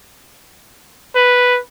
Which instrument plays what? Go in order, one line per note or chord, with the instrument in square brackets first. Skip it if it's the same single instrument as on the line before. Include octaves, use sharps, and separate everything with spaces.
[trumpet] B4